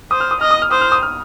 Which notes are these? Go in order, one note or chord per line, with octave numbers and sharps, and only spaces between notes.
C5 D#6
F6
D#6
D#5 F6
D#6
F6
C5 D#6
F6
D#6
F6